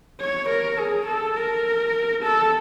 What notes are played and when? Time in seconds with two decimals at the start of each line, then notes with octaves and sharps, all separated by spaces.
0.20 C#5
0.49 A#4
0.79 G#4
1.07 A4
1.36 A#4
2.23 A4